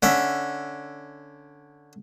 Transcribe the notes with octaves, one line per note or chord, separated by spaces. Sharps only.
D3 C#4 E5